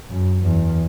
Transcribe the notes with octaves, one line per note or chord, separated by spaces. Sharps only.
F#2
E2